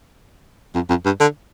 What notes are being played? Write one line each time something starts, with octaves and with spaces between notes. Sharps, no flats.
F2
F2
G2
D3